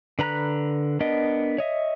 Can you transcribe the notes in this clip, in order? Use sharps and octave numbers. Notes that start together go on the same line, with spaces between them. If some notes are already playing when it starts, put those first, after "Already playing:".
D3 B4 A#5 B5 F#6
B3 D4 A#4 D#5
C#5 D#5 E5